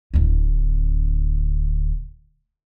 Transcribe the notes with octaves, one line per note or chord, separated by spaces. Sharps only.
D1 D2